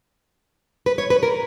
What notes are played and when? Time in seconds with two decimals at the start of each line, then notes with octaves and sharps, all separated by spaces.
0.86 B4
0.98 C#5
1.10 B4
1.23 A#4